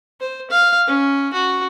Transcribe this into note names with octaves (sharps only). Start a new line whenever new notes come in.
C5
F5
C#4
F#4